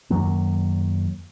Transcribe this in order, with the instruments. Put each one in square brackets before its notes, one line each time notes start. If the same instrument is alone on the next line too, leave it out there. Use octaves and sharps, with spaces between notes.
[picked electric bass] F#2 D#3 F#3 A#3